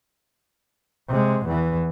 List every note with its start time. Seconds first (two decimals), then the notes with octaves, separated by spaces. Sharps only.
1.09 C3 G#3
1.47 E2 E3